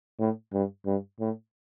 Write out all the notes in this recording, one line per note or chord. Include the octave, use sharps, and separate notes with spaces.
A2
G2
G2
A2